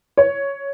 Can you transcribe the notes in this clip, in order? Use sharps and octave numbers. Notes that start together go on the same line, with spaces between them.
C#5